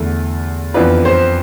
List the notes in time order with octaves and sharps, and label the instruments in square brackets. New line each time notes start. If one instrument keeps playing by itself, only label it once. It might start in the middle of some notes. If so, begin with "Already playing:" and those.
Already playing: [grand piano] E2 D3 A3 E4
[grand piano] F2 E3 B3 D4 F4 [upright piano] B4
[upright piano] C5